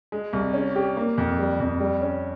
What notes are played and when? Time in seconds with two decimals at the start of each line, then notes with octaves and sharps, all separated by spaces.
0.12 G#3
0.33 C2
0.53 C#4
0.75 G4
0.97 A#3
1.18 F2
1.39 G3
1.60 F2
1.80 G3
2.01 C#4